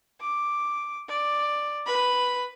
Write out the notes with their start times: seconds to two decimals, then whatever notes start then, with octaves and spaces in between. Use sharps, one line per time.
0.21 D6
1.08 D5
1.86 B4 B5